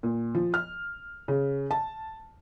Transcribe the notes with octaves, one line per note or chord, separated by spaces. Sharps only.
A#2
F3
F6
C#3
A5